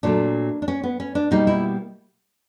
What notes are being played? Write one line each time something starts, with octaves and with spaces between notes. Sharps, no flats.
A#2 F#3 A3 D4
D4
C#4
B3
C#4
D4
B2 G3 A#3 D#4
E4